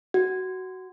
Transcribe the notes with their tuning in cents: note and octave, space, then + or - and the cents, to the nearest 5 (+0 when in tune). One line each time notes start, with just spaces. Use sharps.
F#4 +10